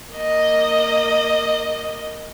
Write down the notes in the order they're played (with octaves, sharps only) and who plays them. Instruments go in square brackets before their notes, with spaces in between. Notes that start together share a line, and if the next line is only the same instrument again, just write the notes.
[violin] A#3 D#5